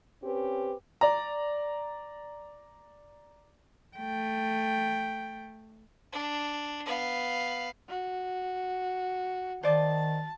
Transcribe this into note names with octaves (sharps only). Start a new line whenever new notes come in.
C4 C#4 G4 B4
D5 A#5
A3 G5
D4
B3 F5
F#4
D#3 C5 D5 D#5 A5